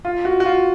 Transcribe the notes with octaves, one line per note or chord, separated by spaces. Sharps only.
F4
F#4
F#4
F4